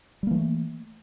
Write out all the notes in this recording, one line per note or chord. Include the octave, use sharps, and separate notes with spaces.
E3 G3 A3 A#3